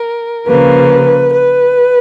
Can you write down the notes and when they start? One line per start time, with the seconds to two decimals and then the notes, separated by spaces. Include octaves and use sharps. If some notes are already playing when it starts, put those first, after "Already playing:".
Already playing: A#4
0.47 C#3 F3 A#3 B4
1.33 B4